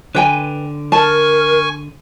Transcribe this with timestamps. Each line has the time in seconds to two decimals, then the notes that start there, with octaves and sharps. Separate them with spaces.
0.15 D3 B4 G5 G#5
0.92 A#4 G#5 A5 C#6